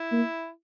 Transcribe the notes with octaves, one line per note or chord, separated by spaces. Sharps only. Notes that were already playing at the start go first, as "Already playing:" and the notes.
Already playing: E4
A#3